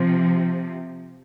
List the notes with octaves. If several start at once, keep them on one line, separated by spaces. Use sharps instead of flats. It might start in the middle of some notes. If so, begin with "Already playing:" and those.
Already playing: C3 F3